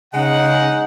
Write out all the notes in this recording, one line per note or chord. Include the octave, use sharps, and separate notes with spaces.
C#3 G#3 D#4 F#5